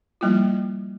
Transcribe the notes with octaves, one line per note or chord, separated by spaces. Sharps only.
F3 G3 A#3 E4 F4